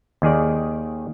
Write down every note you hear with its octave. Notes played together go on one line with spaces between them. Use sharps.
D#2 D#3 G#4 D5